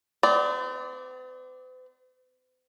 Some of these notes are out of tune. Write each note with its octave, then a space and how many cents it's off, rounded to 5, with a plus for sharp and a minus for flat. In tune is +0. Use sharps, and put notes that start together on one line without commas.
C4 -45 D5 +0